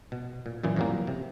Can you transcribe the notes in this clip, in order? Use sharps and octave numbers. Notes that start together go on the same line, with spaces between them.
B2
A#2
F#2 A#2 E3
F2 A2 E3 F#3 G3 A#3
C3